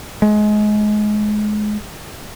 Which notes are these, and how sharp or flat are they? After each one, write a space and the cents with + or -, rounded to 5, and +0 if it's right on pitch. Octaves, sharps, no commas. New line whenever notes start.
G#3 +25